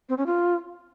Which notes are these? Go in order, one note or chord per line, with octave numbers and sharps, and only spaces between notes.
C4
C#4
F4